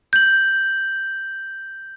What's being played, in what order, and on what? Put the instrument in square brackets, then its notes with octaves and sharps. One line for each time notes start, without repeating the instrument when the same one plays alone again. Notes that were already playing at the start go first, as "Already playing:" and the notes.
[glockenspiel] G6 F#7